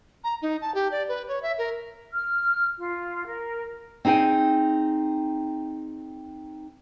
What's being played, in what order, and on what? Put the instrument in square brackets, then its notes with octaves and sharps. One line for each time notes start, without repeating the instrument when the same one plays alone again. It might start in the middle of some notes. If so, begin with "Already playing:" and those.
[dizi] A#5
D#4
A5
G4
D5
B4
C#5
E5
A#4
[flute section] F6
F4
A#4
[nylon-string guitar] C4 D#4 G#4 G5 G#5